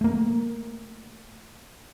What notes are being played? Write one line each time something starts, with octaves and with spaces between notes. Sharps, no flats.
A3 A#3